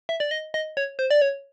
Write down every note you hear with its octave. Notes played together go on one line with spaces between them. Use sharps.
E5
D5
D#5
D#5
C#5
C5
D5
C#5